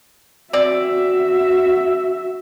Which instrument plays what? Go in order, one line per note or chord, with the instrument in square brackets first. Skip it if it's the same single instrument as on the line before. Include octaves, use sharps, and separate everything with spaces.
[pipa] C4 D5 [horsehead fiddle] F#4 E5